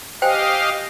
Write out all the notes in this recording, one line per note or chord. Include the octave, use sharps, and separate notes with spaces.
G4 C5 D#5 F5 G5 G#5